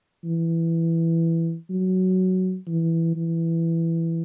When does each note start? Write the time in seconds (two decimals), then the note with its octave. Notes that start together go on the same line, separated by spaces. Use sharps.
0.25 E3
1.70 F#3
2.68 E3
3.16 E3